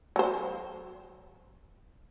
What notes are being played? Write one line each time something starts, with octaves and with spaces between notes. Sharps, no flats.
F#3 C5